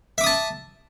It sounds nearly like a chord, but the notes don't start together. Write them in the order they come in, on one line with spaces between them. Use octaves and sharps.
E5 D6 D#6 A5